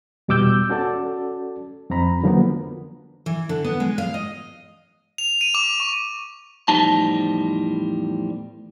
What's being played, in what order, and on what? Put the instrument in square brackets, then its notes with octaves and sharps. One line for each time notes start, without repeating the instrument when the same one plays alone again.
[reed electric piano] E2 B2 G3 D6 E6 G6
C#4 F#4 A4 D5 A5
F2 C4 A#5 B5
D3 F3 F#3 A#3 B3
[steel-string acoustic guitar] E3
D3
B3
G#3
F5
D#5
[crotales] F7
D#7
D6
C#6
[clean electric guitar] E2 A2 F3 G3 D#4 A5